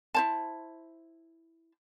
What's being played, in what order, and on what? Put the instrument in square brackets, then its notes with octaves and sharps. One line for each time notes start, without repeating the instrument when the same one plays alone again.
[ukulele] E4 C5 A5